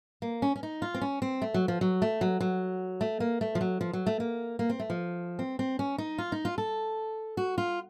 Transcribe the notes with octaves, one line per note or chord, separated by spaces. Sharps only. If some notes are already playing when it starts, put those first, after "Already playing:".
A#3
C#4
C#4
D#4
F4
C4
C#4
C4
A3
F#3
F3
F#3
A3
F#3
F#3
A3
A#3
A3
F3
F#3
F3
F#3
A3
A#3
A#3
C4
A3
F3
C4
C4
C#4
D#4
F4
D#4
F4
A4
F#4
F4